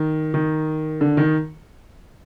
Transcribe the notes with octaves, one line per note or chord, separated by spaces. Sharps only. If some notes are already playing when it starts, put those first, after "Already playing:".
Already playing: D#3
D#3
D3
D#3